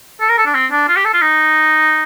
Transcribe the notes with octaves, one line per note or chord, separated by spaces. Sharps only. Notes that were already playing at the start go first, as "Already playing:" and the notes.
A4
A#4
A4
D4
C4
D4
F4
G4
A4
F4
D#4